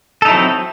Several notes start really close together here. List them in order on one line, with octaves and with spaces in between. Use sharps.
A4 D#4 E4 F#3 C4